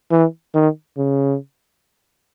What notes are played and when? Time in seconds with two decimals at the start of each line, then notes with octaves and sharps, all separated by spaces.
0.11 E3
0.55 D#3
0.97 C#3